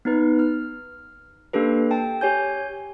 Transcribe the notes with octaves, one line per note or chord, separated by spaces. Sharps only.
B3 D#4 B4
F6
A#3 D4 G4 A4 B4
G5 A5
G4 C#5 G#5 G6